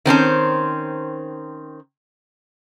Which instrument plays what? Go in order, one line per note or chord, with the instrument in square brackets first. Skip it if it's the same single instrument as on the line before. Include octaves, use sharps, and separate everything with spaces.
[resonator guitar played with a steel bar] D#3 C4 C#4 C5